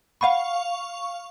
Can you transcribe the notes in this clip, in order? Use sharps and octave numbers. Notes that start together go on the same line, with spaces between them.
F5 F#5 B5 C#6